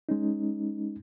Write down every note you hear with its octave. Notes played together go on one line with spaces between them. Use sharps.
G#3 C#4 D#4